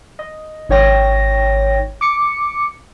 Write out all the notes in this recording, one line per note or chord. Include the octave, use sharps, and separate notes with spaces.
D#5
G#1 D#4 C#5 G5 A#6
D6 C#7